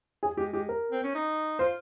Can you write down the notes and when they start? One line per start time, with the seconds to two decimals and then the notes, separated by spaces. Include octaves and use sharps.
0.23 G#4
0.37 G#3 G4
0.53 G#3 G4
0.69 A#4
0.91 C4
1.03 C#4
1.15 D#4
1.59 F4 C5